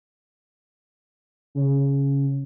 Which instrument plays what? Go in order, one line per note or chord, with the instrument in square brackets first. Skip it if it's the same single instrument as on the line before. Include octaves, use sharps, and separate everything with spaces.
[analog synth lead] C#3